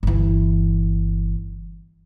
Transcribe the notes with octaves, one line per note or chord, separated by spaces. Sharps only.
G1 E3